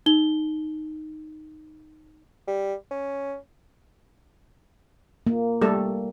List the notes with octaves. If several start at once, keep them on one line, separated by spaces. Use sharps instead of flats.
D#4 G7
G3
C#4
A#3
G3 A3 A4